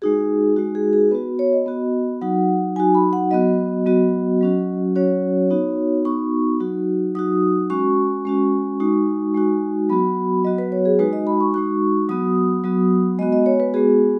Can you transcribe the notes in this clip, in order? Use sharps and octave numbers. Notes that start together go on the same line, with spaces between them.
G#3 D#4 F#4 G#4
G#3 D#4 F#4
G#4
G#4
B3 F#4 B4
C#5
D#5
B3 F#4
F#3 D#4 F#4 F#5
F#3 D#4 F#4 G#5
B5
F#5
F#3 B3 F#4 D#5
F#3 B3 F#4
F#3 C#4 F#4
F#3 C#4 F#4 C#5
B3 D#4 F#4
B3 D#4 F#4 C#6
F#3 D#4 F#4
F#3 D#4 F#4 D#6
G#3 C#4 F#4 C#6
G#3 C#4 F#4
G#3 D#4 F#4
G#3 D#4 F#4
F#3 B3 F#4 B5
F#3 B3 F#4 D#5
B4
C#5
G#4
G#3 D#4 F#4 B4
D#5
B5
C#6
G#3 D#4 F#4 C#6
F#3 B3 F#4 D#6
F#3 B3 F#4
G#3 B3 F#4 D#5
D#5
C#5
B4
G#3 B3 F#4 G#4